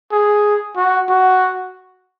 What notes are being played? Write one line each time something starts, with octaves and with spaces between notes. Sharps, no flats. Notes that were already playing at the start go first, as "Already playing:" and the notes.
G#4
F#4
F#4